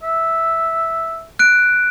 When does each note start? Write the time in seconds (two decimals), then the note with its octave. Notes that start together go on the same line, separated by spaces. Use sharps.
0.03 E5
1.39 F#6 D7